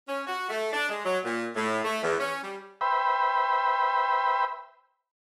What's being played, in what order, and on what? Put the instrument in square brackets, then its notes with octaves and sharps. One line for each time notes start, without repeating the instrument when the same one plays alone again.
[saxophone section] C#4
F#4
A3
D4
G#3
F#3
A#2
A2
A3
E2
C#4
G3
[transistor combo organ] B4 C5 E5 G5 B5